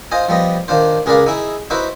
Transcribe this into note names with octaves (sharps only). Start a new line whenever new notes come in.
F4 C5 D#5 G#5
F3 G3 B3 D#5
D#3 D4 F4 C5
C#2 G#4 A#4 B4 D5 F5
D#4 E4 G#4
D#4 E4 F#4 B4 C5